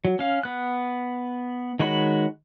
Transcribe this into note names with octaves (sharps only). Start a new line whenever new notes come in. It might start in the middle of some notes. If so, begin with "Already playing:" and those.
F#3
C#4 F5
B3 F#6
D#3 G#3 F#4 C#5 B5